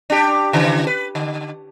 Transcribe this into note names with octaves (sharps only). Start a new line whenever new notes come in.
D4 G4
C#3 E3
B4
D3